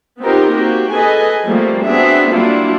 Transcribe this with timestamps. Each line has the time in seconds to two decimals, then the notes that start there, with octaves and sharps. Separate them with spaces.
0.22 B3 C4 D#4 F4 G4 A#4
0.53 A#3 C4 F#4 G4
0.93 G#4 A4 B4 D#5 G#5
1.45 F3 G3 A3 A#3 C4
1.85 B3 C4 D4 F#4 G#4 E5
2.31 F#3 G3 A#3 D4 E4 F4